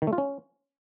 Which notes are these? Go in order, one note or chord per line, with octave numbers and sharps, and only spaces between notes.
D#3
A3
F4
C#4